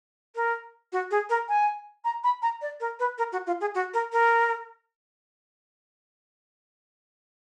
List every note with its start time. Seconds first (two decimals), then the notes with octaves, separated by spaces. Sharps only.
0.36 A#4
0.93 F#4
1.11 G#4
1.30 A#4
1.49 G#5
2.05 A#5
2.24 B5
2.42 A#5
2.62 D5
2.80 A#4
2.99 B4
3.18 A#4
3.32 F#4
3.47 F4
3.61 G#4
3.75 F#4
3.94 A#4
4.13 A#4